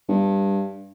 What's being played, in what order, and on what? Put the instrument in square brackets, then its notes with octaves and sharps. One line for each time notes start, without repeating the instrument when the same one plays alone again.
[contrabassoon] G2